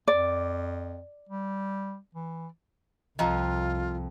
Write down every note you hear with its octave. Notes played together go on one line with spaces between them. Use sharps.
F2 D5
G3
E3
C2 F2 F4 D#5 A#5